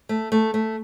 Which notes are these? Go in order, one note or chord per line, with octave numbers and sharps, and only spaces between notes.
A3
A3
A3